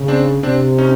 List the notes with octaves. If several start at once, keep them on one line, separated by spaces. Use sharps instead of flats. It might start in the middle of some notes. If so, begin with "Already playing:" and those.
Already playing: C#3
C4 D4
C3 C4 D4
C#4 D#4